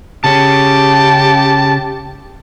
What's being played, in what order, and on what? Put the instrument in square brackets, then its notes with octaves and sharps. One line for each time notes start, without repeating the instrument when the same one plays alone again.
[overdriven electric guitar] C#3 C#4 [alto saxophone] G4 [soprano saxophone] A5